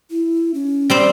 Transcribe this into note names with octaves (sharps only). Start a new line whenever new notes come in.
E4
C#4
G3 C4 C5